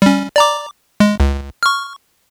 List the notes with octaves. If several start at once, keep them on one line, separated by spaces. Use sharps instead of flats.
G3 C#4
D5 A#5 D6
G#3
C#2
C#6 F6